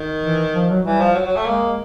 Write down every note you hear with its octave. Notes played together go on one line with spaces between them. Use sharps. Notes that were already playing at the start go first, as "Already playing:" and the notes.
Already playing: D#3
E3
F3
F#3
E3 G3
F3
F#3
F#3
A3
G#3 A#3